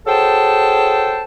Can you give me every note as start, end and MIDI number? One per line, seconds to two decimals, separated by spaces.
0.07 1.23 54
0.07 1.23 68
0.07 1.23 69
0.07 1.23 72
0.07 1.23 79
0.07 1.23 81